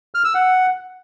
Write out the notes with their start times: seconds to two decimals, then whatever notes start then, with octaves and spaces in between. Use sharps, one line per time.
0.15 F6
0.24 E6
0.34 F#5